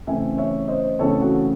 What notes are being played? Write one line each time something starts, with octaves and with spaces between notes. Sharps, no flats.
C#3 E3 A3 C4 E5 G#5
C#5 E5
C5 D#5
C#3 E3 A3 C4 A4 C#5
F#4 A4